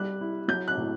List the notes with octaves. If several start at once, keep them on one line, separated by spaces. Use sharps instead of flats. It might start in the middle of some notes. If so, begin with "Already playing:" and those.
Already playing: G3 F#6
E4
F#3 G6
F#6
A2